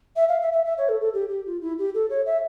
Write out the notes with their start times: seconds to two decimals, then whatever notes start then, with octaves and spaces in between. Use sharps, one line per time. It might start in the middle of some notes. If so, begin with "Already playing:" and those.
0.16 E5
0.28 F5
0.41 E5
0.52 E5
0.65 E5
0.77 C#5
0.88 A4
1.01 A4
1.13 G4
1.29 G4
1.45 F4
1.61 E4
1.78 G4
1.94 A4
2.09 C#5
2.25 E5